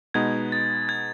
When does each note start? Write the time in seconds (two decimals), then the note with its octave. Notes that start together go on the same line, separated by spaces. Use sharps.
0.14 B2 G#3 B3 D#4 G#6
0.52 A6
0.89 G#6